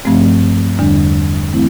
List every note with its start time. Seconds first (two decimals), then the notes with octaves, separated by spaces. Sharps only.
0.05 G2 F3 A3 C4
0.79 E2 D3 G3 D4
1.53 E3 A3 C4 E4